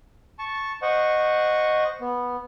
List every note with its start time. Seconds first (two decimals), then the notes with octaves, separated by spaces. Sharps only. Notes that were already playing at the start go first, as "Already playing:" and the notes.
0.39 A5 C#6
0.82 C5 D#5 F#5 C#6
2.00 B3